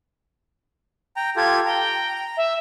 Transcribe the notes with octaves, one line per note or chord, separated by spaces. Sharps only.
G5 A#5
F4 G4 A4 G#6
G5 A#5
E5